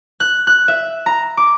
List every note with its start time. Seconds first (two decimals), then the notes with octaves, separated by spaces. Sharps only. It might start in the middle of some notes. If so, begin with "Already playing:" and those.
0.20 F#6
0.47 F#6
0.68 E5
1.06 A#5
1.37 D6